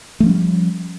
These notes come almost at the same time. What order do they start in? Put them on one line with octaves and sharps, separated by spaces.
A3 F3 C#4 G3